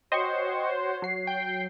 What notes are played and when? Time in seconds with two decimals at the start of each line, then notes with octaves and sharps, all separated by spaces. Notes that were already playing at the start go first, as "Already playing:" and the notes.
0.12 F#4 C5 C#5 D#5 G5 C#6
1.02 F#3 C7
1.27 G5